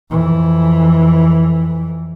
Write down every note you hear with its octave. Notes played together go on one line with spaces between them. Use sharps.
F2 E3